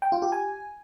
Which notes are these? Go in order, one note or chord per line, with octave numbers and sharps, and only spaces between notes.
G5
F4
G4
G#5